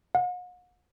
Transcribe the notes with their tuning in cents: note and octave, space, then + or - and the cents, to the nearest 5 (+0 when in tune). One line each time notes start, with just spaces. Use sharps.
F#5 -45